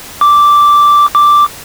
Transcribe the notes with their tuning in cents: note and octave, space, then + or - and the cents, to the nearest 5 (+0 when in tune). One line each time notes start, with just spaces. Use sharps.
D6 -5
D6 +0